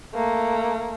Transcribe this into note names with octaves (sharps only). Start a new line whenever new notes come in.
A3 A#3